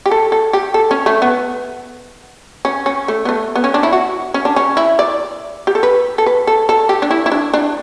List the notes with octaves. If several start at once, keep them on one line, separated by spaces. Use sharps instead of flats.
G4
A4
A4
G4
A4
C#4
A3
B3
C#4
C#4
A3
B3
A3
B3
C#4
D4
E4
F#4
C#4
D4
C#4
E4
D5
G4
A4
B4
A4
B4
A4
A4
G4
D4
E4
E4
D4
D4